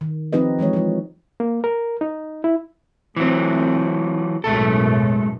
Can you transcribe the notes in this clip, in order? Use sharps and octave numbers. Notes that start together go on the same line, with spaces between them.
D#3
F3 C4 D#4 G4 B4 D#5
E3 F3 G#3 C#5
F3 G#3
A#3
A#4
D#4
E4
E3 F#3 A3 C4
B1 F#2 A2 G#3 A3 A4